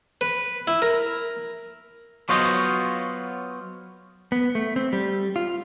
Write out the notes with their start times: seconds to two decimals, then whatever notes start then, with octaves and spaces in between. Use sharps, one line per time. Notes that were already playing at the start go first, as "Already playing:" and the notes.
0.21 B4
0.67 E4
0.82 A#4
2.29 F#3 B3 F4 C5 C#5 D#5
4.32 B3
4.55 A3
4.76 C4
4.93 G3
5.36 F4